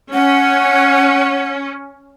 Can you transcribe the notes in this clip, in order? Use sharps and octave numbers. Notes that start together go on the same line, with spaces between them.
C#4 F#5